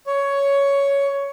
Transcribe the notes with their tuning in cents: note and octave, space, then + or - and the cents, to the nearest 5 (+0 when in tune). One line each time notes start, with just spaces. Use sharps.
C#5 +10